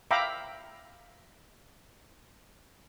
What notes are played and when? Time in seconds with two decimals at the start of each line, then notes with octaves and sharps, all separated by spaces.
0.11 E5 F5 G5 A#5 B5 D6